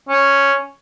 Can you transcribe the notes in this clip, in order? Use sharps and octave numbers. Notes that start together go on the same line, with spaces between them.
C#4